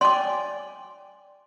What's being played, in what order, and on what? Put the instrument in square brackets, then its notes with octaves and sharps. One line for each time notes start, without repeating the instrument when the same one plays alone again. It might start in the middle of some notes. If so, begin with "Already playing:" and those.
[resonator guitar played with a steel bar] D5 G5 G#5 [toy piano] C6 D6